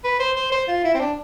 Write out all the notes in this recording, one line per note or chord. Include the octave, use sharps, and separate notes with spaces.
B4
C5
C5
C5
F4
E4
C4
D4